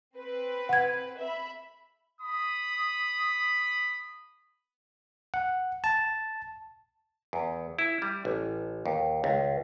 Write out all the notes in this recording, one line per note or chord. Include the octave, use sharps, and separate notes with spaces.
C4 B4
F#5 G#6
E5 B5
B5 D#6
F#5
A5
E2
E4
G3
A1
D#2
C#2